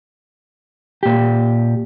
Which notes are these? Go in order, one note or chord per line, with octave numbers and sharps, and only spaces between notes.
A#2 G4